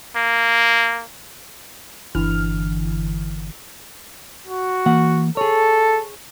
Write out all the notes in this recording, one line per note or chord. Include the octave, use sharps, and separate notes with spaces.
A#3
G1 D3 E3 F6
F#4
E3 A#3 F#5
G#4 A4 C#5